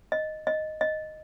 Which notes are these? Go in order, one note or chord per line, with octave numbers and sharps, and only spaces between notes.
D#5
D#5
D#5